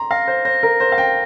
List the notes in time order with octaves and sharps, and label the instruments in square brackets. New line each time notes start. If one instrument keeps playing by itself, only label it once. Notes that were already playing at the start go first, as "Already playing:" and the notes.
Already playing: [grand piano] A#5 C6
[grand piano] F5 [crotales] A#6
[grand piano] C5
[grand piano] C5 [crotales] A#6
[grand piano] A#4
[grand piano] C5 [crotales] A#6
[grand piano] F5
G5